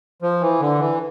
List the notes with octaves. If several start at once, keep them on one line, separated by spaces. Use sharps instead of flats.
F3
E3
D3
E3